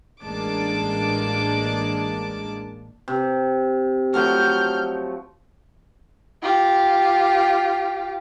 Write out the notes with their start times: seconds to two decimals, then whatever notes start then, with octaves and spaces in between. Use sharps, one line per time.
0.22 A1 G#3 A#3 D4 A5 D6
3.08 C3
4.14 F3 F#3 A3 F6 G6
6.43 F4 G4